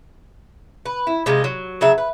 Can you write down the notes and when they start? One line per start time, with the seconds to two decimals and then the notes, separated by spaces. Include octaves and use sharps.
0.86 B4
1.07 E4
1.26 C3 G#3 D#4 F4
1.44 F#3
1.81 C#3 F#3 E5
1.98 B4